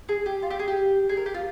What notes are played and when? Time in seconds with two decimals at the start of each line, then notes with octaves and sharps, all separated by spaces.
0.09 G#4
0.26 G4
0.42 F4
0.51 G4
0.59 G#4
0.68 G4
1.09 G#4
1.17 A#4
1.26 G4
1.34 F4